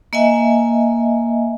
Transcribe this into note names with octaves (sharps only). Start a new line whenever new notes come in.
A#3 D#5 E5 G#5